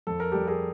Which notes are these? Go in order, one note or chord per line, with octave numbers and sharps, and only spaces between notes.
F2 A4
A#4
G3 G4 A4
G#4 A#4